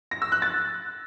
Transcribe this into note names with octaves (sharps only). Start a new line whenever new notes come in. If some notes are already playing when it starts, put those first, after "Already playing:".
A#6
E6
F#6
A6